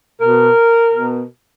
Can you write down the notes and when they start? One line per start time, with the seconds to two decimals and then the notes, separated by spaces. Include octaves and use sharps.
0.21 B2 A#4
0.94 B2